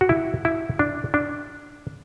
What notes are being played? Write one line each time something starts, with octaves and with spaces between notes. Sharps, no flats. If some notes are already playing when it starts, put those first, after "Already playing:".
F#4
E4
E4
D4
D4